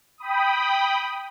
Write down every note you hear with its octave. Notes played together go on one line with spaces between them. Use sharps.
G5 B5 D#6